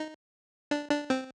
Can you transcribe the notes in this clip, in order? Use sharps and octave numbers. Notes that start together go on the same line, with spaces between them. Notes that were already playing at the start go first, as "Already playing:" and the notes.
Already playing: D#4
D4
D4
C4